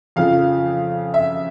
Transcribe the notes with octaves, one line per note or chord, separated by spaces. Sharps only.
F2 C#3 F3 F5
E5